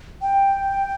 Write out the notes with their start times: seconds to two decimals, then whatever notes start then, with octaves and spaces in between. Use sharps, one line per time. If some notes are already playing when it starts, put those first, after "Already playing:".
0.22 G5